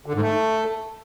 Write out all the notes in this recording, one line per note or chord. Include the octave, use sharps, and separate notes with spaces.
D3
G#2
A3